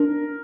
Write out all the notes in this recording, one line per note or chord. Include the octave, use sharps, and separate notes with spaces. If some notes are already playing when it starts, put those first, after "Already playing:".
Already playing: D4 A#4